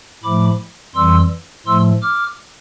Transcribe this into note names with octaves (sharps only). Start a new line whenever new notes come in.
A2 F3 A3 B5 D6
F2 E3 G3 C6 E6
A2 F3 A3 C6 E6
D6 F6